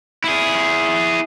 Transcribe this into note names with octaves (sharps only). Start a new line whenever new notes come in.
E4 G#4